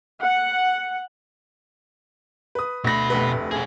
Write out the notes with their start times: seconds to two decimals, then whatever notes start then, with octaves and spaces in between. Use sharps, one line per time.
0.21 F#5
2.55 B4 D#6
2.84 D2 B2 B5 A#6
3.10 F1 D2 B4
3.51 D4 G#4